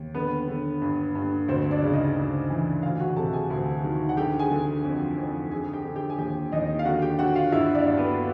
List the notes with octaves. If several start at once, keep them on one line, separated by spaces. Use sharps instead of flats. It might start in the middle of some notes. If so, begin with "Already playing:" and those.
Already playing: D#2
D3 B3 B4
D3
G2
G2
D2 C4 C5
D4 D5
C#3
D#4 D#5
D2
E3
D2 F4 F5
F#4 F#5
C3 A4 A5
G#4 G#5
D2
D#3
F#5
D3 G4 G5
G#4 G#5
D3
F2
F2
D3 G#4 G#5
G4 G5
D3
G4 G5
G#5
D#2 G4 G5
D#2 D#4 D#5
F5
D3 F#4 F#5
G4 G5
D3 F#4 F#5
F4 F5
G2 E4 E5
D4 D5
G2
B3 B4